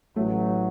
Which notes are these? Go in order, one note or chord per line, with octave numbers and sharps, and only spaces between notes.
A1 A2 F#3 A3